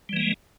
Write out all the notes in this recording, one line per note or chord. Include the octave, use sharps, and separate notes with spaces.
E3 G3 G#3 A#3